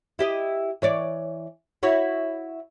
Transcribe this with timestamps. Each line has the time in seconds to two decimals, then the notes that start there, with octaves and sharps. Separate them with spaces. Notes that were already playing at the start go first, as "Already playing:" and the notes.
0.19 E4 G4 D#5
0.82 E3 C#5 D5
1.83 E4 F#4 C#5